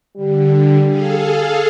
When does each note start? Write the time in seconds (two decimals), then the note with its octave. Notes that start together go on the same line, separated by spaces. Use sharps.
0.17 D3 G3
0.85 G#4 A4 F5